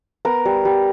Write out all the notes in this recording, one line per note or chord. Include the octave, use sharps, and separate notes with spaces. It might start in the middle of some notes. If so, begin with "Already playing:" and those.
B3 A#4
G3
G3